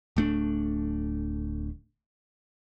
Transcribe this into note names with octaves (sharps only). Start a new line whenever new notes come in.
D1 A3 D4